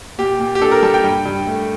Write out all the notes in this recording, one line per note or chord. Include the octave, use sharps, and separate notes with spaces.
A#2 G4
A#2
G4
D4 A4
A#4
G3 A5
G5
G2
G2
A3